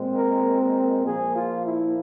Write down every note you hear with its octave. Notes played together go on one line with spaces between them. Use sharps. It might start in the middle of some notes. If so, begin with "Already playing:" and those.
Already playing: A#2 G#3 C4
A#4
A#4
A#2 F3 A#3 G#4
F4
E4